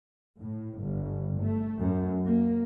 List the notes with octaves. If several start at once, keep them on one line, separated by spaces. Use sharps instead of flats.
A2
G1
A3
F#2
A#3